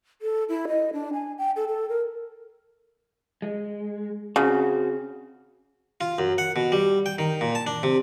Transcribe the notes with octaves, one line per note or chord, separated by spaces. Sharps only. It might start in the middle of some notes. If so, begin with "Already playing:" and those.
A4
E4
D#5
D4
G#5
G5
A4
A4
A#4
G#3
C#3 C4 F#4
F4
F#2
F#5
B2
G3
G5
D#3
A#2
A5
D4
C3